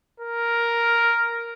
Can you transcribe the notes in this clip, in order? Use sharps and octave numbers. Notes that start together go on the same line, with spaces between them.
A#4